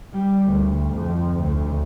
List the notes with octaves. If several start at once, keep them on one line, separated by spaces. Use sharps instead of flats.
G3
D2
F2
D2